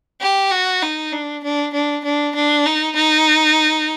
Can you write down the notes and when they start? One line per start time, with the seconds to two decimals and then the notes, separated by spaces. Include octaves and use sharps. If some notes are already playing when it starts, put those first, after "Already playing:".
0.21 G4
0.51 F#4
0.82 D#4
1.12 D4
1.44 D4
1.74 D4
2.04 D4
2.35 D4
2.65 D#4
2.96 D#4